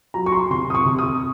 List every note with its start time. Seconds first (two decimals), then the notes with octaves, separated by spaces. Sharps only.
0.14 F#3 A#5
0.26 C#6
0.32 C6
0.50 C3 C6
0.70 D#6
0.75 C#6
0.86 C3
0.99 D#6